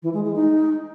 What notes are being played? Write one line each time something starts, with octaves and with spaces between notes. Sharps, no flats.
E3
G#3
G#3
D#4